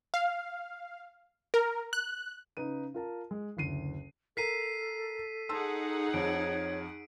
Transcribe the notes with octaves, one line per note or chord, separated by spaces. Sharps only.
F5
A#4
F#6
C#3 D#4 B4 D#7
F4 A#4 A5
G#3
F#1 D2 C7 D#7
A4 A#4 A#5 B6 C7 D#7
D#4 G#4 F#5 A5 C6 E6
F2 C#5 D7